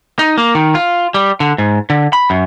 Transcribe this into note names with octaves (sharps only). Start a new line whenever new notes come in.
D#4
A#3
D#3
F4
G3
D3
G#2
D3
B5
F#2